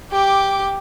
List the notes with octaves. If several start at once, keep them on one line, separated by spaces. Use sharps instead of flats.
G4 D6